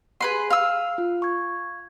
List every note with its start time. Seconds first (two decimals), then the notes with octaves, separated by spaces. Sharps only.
0.21 G#4 B4 C6
0.50 F5 E6
0.98 F4
1.22 C#6 G#6